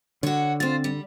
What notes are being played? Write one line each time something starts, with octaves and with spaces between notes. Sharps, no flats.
D3 F#4 C#5
C4 F4 C5 A6
G3